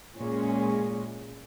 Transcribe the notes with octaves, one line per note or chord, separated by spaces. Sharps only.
A#2 G#3 C#4